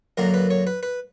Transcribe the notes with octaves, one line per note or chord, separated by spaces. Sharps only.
F#2 D3 F#3 A#3 A#4
B4
C#5
B4
B4